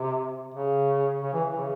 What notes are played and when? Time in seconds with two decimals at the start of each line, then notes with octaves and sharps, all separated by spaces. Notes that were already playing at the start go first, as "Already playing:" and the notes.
Already playing: C3
0.54 C#3
1.23 C#3
1.34 E3
1.45 E3
1.57 C#3